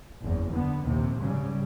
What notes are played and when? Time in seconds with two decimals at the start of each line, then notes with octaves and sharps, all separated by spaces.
0.22 F#1 E2
0.53 D3 B3
0.84 A#1 D#2 C3
1.20 G#2 C#3 G3